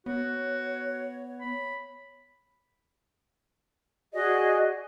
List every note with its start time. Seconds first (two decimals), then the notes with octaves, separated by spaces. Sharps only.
0.06 B3 F#4 C#5
1.40 B5
4.13 F#4 G#4 D5 D#5